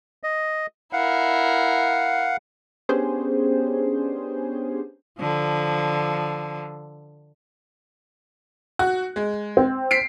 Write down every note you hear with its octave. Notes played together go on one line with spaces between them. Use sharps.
D#5
E4 A#4 F5 F#5
B3 C#4 D4 G4 G#4 C5
D3 F3
F#4 F#6
G#3
C4
B6 C7 D7